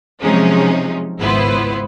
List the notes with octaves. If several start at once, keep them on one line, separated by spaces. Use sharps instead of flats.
C3 F3 F#3 G#3 C#4 D#4
G#1 C#2 B3 E4 B4 C5